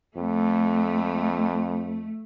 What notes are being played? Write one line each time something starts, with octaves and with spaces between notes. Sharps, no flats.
F2 A3